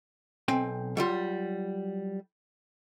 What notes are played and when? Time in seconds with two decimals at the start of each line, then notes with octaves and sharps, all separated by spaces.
0.48 B1 C4 G5 G#5
0.97 F#3 G3 F4